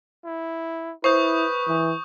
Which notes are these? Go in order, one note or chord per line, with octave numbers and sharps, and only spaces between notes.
E4
E4 B4 C5 C#6 D#6 G6
E3